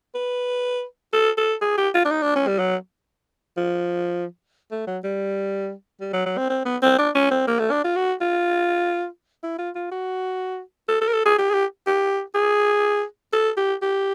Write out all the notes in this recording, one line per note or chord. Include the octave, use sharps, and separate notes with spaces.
B4
A4
A4
G#4
G4
F4
D4
D#4
D4
C#4
G3
F#3
F3
A3
F#3
G3
G3
F#3
F#3
C4
C4
B3
C4
D4
C#4
C4
A#3
A3
D4
F4
F#4
F4
E4
F4
F4
F#4
A4
A4
A#4
A4
G#4
G4
G#4
G4
G4
G#4
A4
G4
G4